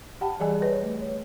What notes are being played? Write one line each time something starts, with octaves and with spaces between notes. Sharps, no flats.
G4 F#5 G5 A5 B5
E3 G3 G#4 D5 D#5 G#5
B4 C#5
A3
C#5